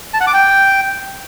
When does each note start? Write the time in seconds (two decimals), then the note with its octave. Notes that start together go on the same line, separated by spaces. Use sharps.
0.14 A5
0.20 F#5
0.27 D6
0.34 G5